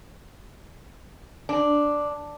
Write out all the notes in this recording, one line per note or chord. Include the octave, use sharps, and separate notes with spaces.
D4